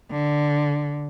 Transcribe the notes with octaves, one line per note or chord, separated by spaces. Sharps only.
D3